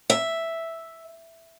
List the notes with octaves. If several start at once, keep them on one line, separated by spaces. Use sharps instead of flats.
E5